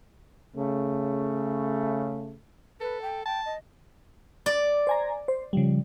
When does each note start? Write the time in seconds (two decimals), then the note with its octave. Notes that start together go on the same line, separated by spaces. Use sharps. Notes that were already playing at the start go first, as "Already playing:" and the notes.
0.56 C#3 A3
2.81 A4 B4
3.02 G5
3.26 G5 A5
3.45 D#5
4.46 D5
4.87 C5 G#5 A#5
5.28 C5
5.53 C#3 F3 G3